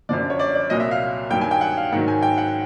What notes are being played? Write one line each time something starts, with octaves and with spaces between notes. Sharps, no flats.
F#2 D3 F3 D5
C#5
D5
D5
C2 A#2 F#3 D#5
E5
F5
G2 D#3 F#3 G5
G#5
G5
F#5
F5
G#2 D#3 F#3 F#5
G#5
G5
F#5